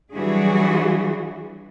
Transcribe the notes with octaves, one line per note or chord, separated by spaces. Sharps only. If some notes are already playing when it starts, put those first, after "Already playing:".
E3 F#3 G3 D4 F#4 G#4